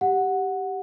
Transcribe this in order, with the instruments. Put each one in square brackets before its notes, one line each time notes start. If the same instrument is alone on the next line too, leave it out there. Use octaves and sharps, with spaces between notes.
[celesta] G4 F#5